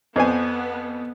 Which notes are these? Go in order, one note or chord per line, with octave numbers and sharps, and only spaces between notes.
F2 B3 C5 G#5